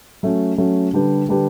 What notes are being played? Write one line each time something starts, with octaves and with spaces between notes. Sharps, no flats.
F#3 A3 C#4
F#3 A3 C#4
D3 G3 D4 G4 B4
D3 G3 D4 G4 B4